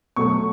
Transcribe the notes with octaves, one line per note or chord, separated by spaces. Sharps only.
B2 F#3 A3 C#6